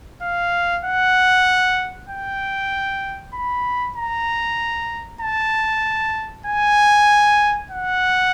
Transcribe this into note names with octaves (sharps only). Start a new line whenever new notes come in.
F5
F#5
G5
B5
A#5
A5
G#5
F#5